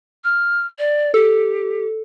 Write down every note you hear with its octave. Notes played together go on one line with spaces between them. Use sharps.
F6
D5
G4 A4